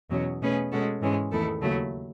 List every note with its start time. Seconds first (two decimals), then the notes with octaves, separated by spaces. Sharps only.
0.11 E2 B2 F#3 C#4
0.41 B2 A3 C#4 G#4 B4
0.72 B2 G#3 C#4 F#4 A4
1.01 G#2 E3 G#3 C#4
1.31 E2 D#3 A3 E4 A4
1.62 D#2 C#3 F#3 A3 E4